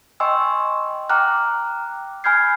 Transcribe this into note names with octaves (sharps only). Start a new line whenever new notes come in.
D#5 G5 G#5 C6 C#6 E6
G5 A#5 D6 F6 F#6
G#5 B5 F6 G6 G#6 C7